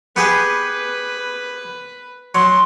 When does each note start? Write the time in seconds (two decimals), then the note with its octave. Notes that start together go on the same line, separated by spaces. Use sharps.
0.16 B3 G4 G#4 B4
2.35 F#3 C6